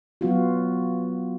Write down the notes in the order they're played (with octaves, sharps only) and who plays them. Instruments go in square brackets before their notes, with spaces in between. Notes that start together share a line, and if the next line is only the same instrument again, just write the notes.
[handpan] F#3 B3 F4 F#4